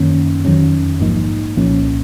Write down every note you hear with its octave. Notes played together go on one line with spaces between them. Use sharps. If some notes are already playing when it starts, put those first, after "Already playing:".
Already playing: F#2 D#3 A#3 C#4
F2 D#3 F#3 C#4
A#1 G#2 F3 A#3 D#4
C2 A#2 F3 A#3 C#4